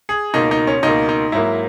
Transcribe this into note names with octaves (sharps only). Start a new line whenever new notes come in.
G#4
C#2 B2 A#3 D#4
D#4
C#4
C#2 B2 A#3 D#4
D#4
G#2 F#3 A#3 E4